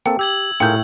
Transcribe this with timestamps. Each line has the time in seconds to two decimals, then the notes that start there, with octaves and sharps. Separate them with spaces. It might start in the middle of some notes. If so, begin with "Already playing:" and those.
0.06 A#3 C4 A4 G5
0.19 G4 E6 G#6 F#7
0.60 A2 F4 G#4 A#4 G5 G6